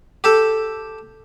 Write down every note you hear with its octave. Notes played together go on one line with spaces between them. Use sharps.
G4 A4